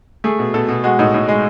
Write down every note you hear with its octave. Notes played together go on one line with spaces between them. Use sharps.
A3 G#4
B2
B2 A4
B2
G#3 F#4
A2 D#4
A2
G#3